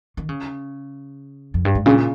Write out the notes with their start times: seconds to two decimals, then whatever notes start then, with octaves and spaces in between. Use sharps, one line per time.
0.17 D#3
0.29 C#3
1.54 F2
1.65 G2
1.75 G#2
1.86 A#2 C#3